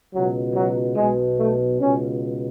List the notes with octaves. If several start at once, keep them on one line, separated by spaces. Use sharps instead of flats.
C#2 B2 F#3
F#3
B1 B2 G#3
A3
C#2 B2 C#4